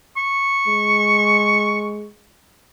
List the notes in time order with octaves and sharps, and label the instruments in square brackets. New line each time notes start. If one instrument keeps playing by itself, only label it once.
[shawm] C#6
[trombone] G#3